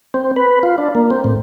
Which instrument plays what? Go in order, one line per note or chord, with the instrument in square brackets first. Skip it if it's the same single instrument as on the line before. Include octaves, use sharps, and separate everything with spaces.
[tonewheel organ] C4
B4
F4
D4
A#3
C4
A2